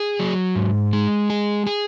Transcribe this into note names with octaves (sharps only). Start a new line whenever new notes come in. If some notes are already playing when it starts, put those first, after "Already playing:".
Already playing: G#4
F#3
G#2
G#3
G#4
G#4